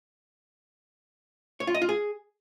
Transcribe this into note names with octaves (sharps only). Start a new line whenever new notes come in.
C#5
F4
D#5
F4
G#4